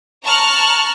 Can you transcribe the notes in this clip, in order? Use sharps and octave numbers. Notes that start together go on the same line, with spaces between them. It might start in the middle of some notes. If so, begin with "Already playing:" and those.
A5 A#5 C#6 F6 F#6